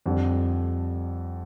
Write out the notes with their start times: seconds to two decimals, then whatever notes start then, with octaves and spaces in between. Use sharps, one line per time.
0.06 F2 D3 G3